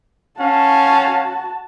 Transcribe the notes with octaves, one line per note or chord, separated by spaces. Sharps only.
C#4 F#4 F5 A5